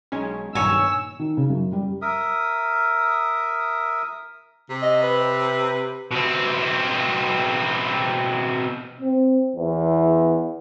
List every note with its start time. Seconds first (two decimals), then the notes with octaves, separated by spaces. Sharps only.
0.12 B1 G#3 C#4 G#5
0.55 B1 G2 A#2 D#3 C#5 G#5 E6
1.19 D#3
1.37 C#3
1.50 F#2
1.73 G3
2.02 A#4 E5 D#6
4.70 C3
4.82 D#5
5.03 B4
5.19 B4
6.11 B2 C4
9.01 C4
9.56 E2